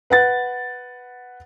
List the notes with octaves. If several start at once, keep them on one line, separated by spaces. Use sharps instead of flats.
B4 F#5 A6